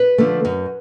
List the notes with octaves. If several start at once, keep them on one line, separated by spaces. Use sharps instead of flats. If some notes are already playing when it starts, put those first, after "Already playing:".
Already playing: B4
D3 F3 A3
F#2